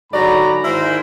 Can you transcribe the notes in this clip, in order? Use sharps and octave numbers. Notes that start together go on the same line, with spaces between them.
G#2 D3 F#3 D5 A#5 B5
G#2 D#3 E4 A#4 C5